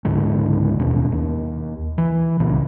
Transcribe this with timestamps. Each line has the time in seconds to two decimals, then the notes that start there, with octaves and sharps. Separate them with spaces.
0.05 C#2 G#2 D3 G#3
0.80 D#2 B2
1.12 D#2
1.98 E3
2.40 C2 A#2 C#3 E3